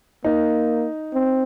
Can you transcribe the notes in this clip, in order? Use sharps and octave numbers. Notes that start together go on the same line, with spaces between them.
A#3 D#4
C4